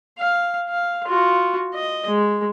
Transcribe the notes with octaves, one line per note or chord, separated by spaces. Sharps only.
F5
F5
F4 F#4
D#5
G#3